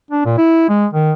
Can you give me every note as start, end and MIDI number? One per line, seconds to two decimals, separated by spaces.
0.11 0.25 62
0.25 0.36 46
0.38 0.65 64
0.69 0.86 56
0.93 1.12 51